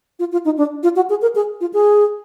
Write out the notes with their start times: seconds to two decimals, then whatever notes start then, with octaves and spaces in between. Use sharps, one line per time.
0.19 F4
0.32 F4
0.45 D#4
0.57 D4
0.83 F4
0.96 F#4
1.10 G#4
1.22 A#4
1.35 G#4
1.61 F4
1.73 G#4